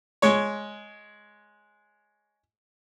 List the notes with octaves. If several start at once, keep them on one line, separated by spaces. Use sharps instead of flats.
G#3 C#5